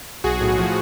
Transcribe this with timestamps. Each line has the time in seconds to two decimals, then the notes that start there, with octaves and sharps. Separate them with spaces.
0.24 B1 F#4 G#4
0.41 A2
0.58 F3